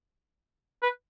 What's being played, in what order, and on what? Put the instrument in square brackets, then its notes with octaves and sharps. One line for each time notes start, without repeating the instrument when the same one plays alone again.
[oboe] B4